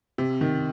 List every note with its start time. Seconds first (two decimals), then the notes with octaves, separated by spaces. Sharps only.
0.18 C3
0.41 D#3